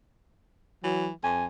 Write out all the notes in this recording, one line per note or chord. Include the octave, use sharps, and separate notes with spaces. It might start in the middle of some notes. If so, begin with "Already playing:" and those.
E3 F#3
F2 G#5